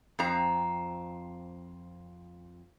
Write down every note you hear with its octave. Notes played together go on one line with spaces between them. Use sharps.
F2 C4 A#5